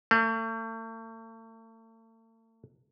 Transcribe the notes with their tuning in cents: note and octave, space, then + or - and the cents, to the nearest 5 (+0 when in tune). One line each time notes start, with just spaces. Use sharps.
A3 +40